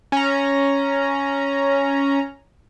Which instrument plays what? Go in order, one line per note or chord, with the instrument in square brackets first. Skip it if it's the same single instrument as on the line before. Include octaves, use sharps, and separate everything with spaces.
[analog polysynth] C#4 A#5